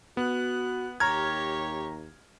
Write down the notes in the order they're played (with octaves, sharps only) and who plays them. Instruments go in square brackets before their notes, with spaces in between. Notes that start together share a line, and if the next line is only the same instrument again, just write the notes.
[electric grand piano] B3 [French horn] F#4 [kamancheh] F#6
[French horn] D#2 [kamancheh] G4 C#5 [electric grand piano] A#5 F6 G#6